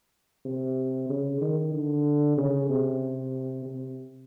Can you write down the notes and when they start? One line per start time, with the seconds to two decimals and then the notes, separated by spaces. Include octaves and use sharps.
0.45 C3
1.09 C#3
1.41 D#3
1.74 D3
2.38 C#3
2.70 C3
3.66 C3